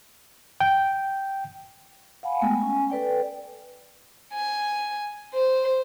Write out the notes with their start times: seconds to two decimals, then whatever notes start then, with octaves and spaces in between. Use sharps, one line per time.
0.60 G5
2.23 F5 F#5 G#5 B5
2.41 G#3 A3 B3 G5 G#5
2.60 C#4 G#5
2.90 A4 B4 D5 G5
4.33 G#5
5.34 C5